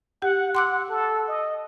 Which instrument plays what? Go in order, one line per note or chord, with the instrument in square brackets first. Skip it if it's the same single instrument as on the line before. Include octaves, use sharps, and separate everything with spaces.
[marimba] G4 [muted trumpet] F#5
[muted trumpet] F#5 [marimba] C6 D6 E6
[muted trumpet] A4
D#5